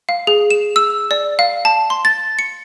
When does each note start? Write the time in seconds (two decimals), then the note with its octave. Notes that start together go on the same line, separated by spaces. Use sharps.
0.09 F5
0.27 G#4
0.50 E7
0.76 E6
1.11 D5
1.39 F5
1.65 A5
1.90 C6
2.05 A6
2.39 C#7